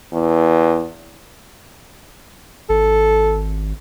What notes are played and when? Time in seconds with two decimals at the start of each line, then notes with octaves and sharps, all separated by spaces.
0.13 E2
2.69 G#1 A4